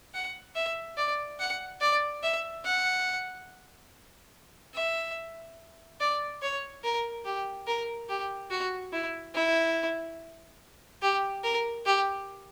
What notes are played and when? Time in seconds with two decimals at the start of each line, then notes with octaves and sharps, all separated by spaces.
0.14 F#5
0.55 E5
0.97 D5
1.39 F#5
1.81 D5
2.23 E5
2.65 F#5
4.74 E5
6.00 D5
6.42 C#5
6.83 A#4
7.25 G4
7.67 A#4
8.09 G4
8.50 F#4
8.93 E4
9.35 E4
11.02 G4
11.43 A#4
11.86 G4